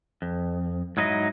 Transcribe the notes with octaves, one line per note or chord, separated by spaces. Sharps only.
F2
G#2 F#3 D#4 E4 D#5